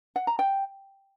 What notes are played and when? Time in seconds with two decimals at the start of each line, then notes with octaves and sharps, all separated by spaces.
0.16 F#5
0.27 A#5
0.39 G5